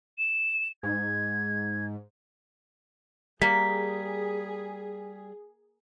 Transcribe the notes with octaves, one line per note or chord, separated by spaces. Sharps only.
E7
G#2 G#6
G3 A#3 G#4 B6